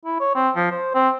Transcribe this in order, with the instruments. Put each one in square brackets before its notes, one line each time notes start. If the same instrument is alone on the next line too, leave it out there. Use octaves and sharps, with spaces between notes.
[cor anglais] E4
C#5
C4
F3
C5
C4